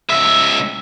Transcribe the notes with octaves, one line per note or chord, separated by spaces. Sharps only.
C#2 E5